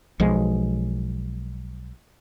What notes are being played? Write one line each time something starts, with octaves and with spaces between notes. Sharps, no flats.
B1 F3 G#3